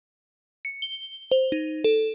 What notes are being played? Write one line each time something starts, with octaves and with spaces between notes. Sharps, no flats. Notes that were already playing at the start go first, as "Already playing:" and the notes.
C#7
G7
C5
D#4
A4